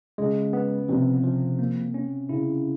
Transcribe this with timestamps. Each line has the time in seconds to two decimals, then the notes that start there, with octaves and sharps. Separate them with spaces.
0.18 C#3 G#3
0.53 B3
0.89 C3 F3
1.24 F3
1.59 A#3
1.94 C#4
2.29 C#3 E4